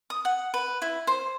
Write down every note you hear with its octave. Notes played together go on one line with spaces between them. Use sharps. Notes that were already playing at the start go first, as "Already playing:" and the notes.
D#6
F#5
B4
E4
C5